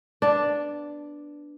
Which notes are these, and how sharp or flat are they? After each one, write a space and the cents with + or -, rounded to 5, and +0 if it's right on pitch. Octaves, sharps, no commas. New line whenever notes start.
B3 +0 D4 +0 D5 +0